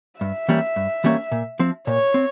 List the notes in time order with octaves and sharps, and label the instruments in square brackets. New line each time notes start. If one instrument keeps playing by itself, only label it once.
[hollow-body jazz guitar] G2 [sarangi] E5
[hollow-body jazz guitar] E3 G3 A#3 C#4
G2
E3 G3 A#3 C#4
A#2
F3 C4
[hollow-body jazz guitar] A#2 [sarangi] C#5
[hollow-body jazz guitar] C4